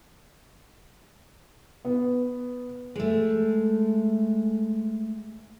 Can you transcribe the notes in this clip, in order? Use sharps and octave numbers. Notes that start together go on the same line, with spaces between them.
B3
G#3 A3